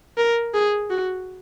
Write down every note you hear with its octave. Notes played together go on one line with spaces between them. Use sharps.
A#4
G#4
F#4